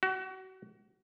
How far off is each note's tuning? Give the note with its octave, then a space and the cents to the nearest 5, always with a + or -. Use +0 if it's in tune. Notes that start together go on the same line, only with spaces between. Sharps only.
F#4 +30